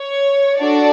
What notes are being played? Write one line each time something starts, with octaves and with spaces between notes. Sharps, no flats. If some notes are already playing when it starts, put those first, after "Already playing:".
Already playing: C#5
D4 F#4 A4 D5